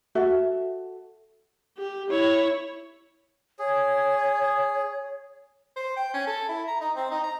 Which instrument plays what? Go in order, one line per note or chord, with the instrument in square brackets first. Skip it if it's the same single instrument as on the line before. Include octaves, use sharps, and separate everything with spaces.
[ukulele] F#4 A4 E5
[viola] G4
E4 C#5
[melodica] G#4 [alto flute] C#5
[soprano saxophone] C5
G5
C#4
A4
E4
A#5
D#4
C4
D#4
A#5